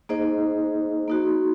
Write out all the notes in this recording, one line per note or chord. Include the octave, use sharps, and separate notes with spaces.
A#3 D#4 G#4 C5 D#5
A#3 D#4 F#4